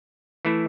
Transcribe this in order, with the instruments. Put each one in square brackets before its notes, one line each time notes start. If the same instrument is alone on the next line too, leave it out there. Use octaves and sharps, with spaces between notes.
[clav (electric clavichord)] E3 A3 E4